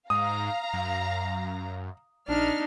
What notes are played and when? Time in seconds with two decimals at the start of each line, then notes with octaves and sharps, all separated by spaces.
0.10 G#2 F5 A#5 D#6
0.73 F#2
2.28 A#1 D4 D#4 F6